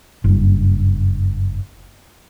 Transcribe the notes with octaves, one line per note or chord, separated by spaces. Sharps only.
F#1 G2